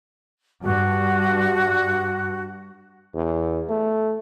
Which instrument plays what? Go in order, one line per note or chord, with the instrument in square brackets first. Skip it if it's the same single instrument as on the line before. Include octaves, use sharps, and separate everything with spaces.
[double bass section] G2 [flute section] F#4
[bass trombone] E2
A3